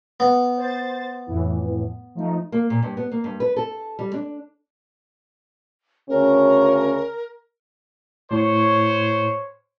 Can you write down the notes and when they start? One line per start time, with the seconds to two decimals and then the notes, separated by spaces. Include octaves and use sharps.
0.20 B3
0.57 C5 A6
1.26 F2 A2 E3
2.15 F3 A3 D#4
2.52 A#3
2.70 A#2
2.83 G2
2.97 B3
3.12 A#3
3.24 G2
3.40 B4
3.56 A4
3.99 G3
4.14 D4
6.09 D2 C#3 C#4 A#4
8.31 A2 C5 C#5